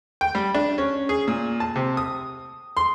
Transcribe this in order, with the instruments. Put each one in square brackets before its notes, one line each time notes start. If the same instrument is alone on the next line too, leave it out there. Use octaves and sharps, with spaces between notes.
[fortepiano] G5
G3
D4
C#4
G#4
A#2
A5
C3
D#6
C6